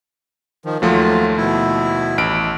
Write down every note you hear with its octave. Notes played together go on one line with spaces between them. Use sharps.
D#3 F3
D#2 F3 F#3 A3 F4
B2 E4
A1 D7